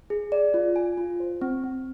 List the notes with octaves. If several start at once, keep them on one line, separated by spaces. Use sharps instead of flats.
G#4
D5
F4
G#5
F4
C5
C4
C4